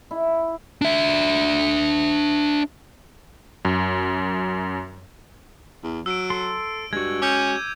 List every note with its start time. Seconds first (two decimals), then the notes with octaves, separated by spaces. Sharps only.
0.11 E4
0.82 D4 E5
3.65 F#2
5.84 E2
6.06 F#3 E6 D7
6.30 A4 C6
6.93 G2 G#3 F#4 G#6
7.22 C#4 D6 G6 D#7